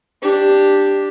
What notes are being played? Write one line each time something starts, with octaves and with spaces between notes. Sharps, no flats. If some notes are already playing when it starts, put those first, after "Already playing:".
D4 G4